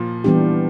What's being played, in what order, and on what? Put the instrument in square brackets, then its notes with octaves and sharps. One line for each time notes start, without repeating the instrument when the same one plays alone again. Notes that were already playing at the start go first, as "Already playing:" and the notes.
Already playing: [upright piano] A#2 F3
[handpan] E3 G3 B3 D4 G4